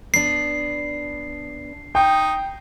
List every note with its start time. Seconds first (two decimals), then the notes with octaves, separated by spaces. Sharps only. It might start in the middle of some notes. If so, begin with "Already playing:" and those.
0.14 B3 D4 C7
1.95 D#4 G5